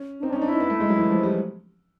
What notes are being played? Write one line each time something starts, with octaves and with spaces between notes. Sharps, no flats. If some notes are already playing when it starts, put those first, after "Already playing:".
Already playing: C#4
D4
C4 D#4
D4
C#4
D#4
D4
D#4 E4
B3
A3
G#3
F#3
E3
F3
G3